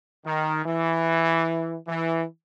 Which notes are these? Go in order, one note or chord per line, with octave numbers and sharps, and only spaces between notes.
D#3
E3
E3